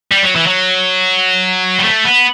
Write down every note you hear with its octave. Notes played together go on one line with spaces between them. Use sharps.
G3
F#3
E3
F#3
G3
A3
B3